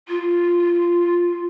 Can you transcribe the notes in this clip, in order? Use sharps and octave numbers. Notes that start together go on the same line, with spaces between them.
F4